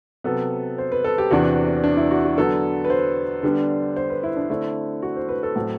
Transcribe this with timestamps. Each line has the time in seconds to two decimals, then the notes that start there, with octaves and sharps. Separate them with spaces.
0.24 C3 F#3 B3 A4
0.78 C5
0.92 B4
1.04 A4
1.18 G4
1.31 E2 C3 E3 B3 D4 F#4
1.84 D4
1.97 E4
2.11 F#4
2.24 F#4
2.38 D3 F#3 B3 A4
2.84 B4
2.90 C5
3.43 D3 G3 B3 D4
3.96 C5
4.10 B4
4.23 E4
4.36 D4
4.50 D3 A3 C4 E4
5.02 F#4
5.16 C5
5.29 B4
5.43 A4
5.56 A2 F#3 C4